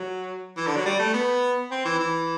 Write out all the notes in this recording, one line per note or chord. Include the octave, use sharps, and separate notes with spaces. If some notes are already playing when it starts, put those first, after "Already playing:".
Already playing: F#3
E3
D3
F#3
G3
A3
B3
C4
E3
E3